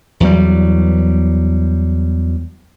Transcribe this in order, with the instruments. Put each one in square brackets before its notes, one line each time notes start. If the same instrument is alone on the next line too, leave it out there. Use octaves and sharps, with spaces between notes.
[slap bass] E2 F#3 G3